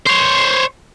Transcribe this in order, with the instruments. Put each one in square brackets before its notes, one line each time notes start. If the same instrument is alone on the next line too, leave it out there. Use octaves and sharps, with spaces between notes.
[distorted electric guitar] C5 C#5